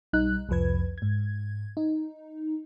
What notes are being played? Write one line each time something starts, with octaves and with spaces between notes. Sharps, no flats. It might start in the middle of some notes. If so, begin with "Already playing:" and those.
B1 G3 D#4 F#6
C2 F2 F3 B4 G#6
G#2 G#6
D#4